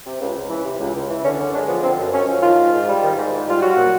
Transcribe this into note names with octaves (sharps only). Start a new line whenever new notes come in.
C3
C#2
C#2
E3
C3
C#2
C#2
E3
D3 C#4
F#2 C#4
G#3 D4
F3 B3
D3 C4
F#2
G#3 C#4
F3
D#3 F4
G#2
G#2
G3
D#3
G#2
G#2
G3 F4
F#3 F#4
A#2